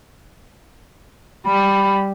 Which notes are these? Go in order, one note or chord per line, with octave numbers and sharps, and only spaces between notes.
G3 B5